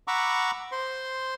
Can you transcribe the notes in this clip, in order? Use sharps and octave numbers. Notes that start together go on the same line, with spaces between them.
F#5 A#5 B5 C#6 D6 E6
C5 C6